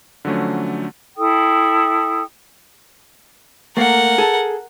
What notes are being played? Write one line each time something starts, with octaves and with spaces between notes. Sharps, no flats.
D3 F3 F#3 A3 C#4
E4 A4 G5 D#6
A3 A#3 A#4 F#5
G#4 A4